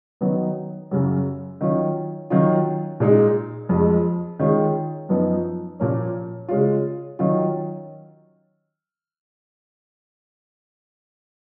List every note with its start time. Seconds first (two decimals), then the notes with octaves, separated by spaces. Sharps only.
0.21 D#3 F#3 B3 D#4
0.91 F#2 C#3 F#3
1.61 D#3 F#3 C#4 F4
2.30 D#3 F#3 C#4 F4
3.00 A#2 G#3 D#4
3.69 F2 F3 G#3
4.39 D#3 G#3 C#4 F4
5.09 F#2 F3 B3 D#4
5.79 A#2 F3 A#3 C#4
6.48 C#3 G#3 C#4 F4
7.19 D#3 F#3 C#4 F4